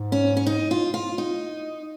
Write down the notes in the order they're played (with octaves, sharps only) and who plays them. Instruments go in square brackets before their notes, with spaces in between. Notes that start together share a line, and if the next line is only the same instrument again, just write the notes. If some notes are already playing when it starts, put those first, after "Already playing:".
Already playing: [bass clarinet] G#2
[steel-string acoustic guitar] C#4
C#4
D#4
F4
F4
D#4